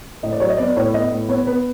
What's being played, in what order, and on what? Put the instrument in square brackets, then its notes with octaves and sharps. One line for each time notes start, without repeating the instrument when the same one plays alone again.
[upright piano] A2 D#5
D5
F#3 C#5
D#5
B3 D5
A2 C#5
B3 D#5
A2
B3 C#5
B3 B4